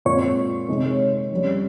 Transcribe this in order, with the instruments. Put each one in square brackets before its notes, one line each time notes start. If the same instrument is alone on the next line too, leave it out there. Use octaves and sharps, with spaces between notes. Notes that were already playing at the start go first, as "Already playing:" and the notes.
[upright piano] A#2 G#3 C4 F4 [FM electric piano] C#5
[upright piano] C3 D#3 G#3 C4
F2 C#3 G3